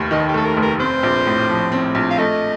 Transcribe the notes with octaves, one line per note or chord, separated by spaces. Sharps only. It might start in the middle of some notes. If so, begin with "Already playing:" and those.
Already playing: F1 D#2 A3
D#3 D#5
G4
A3 A4
A#4
F1
A#4
C4 C5
A#1
A2
F3
C4
A#1
F5
A3 D#5